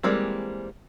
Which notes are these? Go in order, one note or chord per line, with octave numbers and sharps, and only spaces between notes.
E3 G3 G#3 A#3 C4